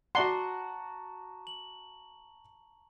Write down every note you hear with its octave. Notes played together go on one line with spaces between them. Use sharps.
F#4 D5 F#5 A5 A#5 C6 C#6
F#7